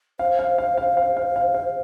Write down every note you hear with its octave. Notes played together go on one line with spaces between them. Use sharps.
C5 F5
F5
F5
F5
F5
F5
F5
F5